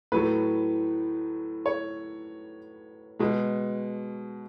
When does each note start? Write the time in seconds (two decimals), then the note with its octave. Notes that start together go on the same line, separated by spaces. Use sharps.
0.12 A2 F#3 A3 B4
1.66 C#5
3.19 B2 G#3